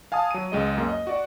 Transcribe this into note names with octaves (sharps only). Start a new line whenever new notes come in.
F5 G#5 A5 D#6
F#3 D#7
C#2 G#3 D#5
F#2 A#3
D#5
F#4 D5 F#5